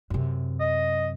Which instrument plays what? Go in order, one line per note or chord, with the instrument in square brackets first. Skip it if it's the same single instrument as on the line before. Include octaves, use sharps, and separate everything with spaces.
[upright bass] F#2 C3
[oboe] D#5